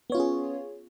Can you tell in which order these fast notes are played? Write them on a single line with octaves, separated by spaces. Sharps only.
B3 C#5 F4 C#4 G#4